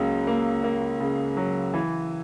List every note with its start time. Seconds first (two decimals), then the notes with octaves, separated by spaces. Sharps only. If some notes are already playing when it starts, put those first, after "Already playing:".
Already playing: C#2 C#3 F#3 A#3
0.27 A#3
0.64 A#3
1.00 C#3
1.37 F#3
1.74 E3